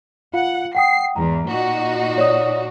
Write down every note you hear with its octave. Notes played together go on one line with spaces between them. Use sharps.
F4 F5 F#5
F#5 G5 D#6 C7
E2 G#2 A#5
A#2 D#4 F#4
C#5 D5 D#6